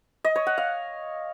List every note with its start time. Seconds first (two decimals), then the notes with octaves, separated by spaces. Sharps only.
0.24 D#5
0.36 C#5
0.47 F#5
0.58 F5